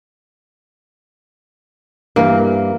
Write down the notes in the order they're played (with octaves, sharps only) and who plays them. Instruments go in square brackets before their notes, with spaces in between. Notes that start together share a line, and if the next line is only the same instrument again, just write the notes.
[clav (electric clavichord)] G2 E3 A#4 [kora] A#3